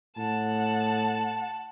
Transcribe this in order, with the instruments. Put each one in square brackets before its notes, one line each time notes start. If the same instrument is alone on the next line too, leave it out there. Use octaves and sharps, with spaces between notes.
[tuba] A2 [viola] F#5 A5